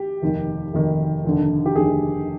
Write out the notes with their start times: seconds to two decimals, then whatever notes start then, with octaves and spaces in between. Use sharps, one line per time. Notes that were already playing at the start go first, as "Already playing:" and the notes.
Already playing: G4
0.22 F1 D#2 D#3
0.74 F1 D#2 D#3
1.24 F1 D#2 D3
1.66 G4
1.76 F1 D#2 D3 G#4